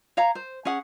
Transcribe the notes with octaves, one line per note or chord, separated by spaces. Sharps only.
C#5 F5 A#5
C5
C#4 G#4 F#5